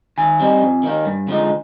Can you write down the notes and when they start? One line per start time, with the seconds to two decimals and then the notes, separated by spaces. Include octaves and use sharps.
0.18 D#3 G#5
0.40 G3 C4 D#4
0.62 F2
0.83 D#3 A#3 D#4
1.05 G2
1.28 D3 F3 G#3 D#4